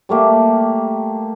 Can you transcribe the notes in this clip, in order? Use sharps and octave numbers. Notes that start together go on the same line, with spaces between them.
G3 A3 A#3 G4